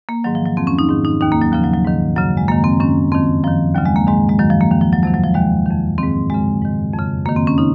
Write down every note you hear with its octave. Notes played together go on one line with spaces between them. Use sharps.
A#3
G#2 D#3 F#3
F3
F#3
F2 D#3 C4
C#4
D#4
G#2 D#3
D#4
D#2 D#3 D#4
A#3
F#3
D#2 C#3 F3
F#3
F#3
G#2 D#3
F#2 C#3 F#3
G#3
F#2 D#3 A#3
C4
F#2 D#3 C#4
F2 D#3 C4
F#2 D#3 F3
D#2 C#3 F#3
G#3
A#3
G#2 D#3 G#3
G#3
F#2 D#3 F#3
F3
A#3
D#2 D#3
F3
F#3
F2 C3 D#3 F#3
F#3
F3
D#2 D#3 G#3
F2 D#3
G#2 D#3 C4
F#2 C#3 G#3
G#2 D#3
F2
C#3
F#2 D#3 A#3
C4
C#4
C#3 D#4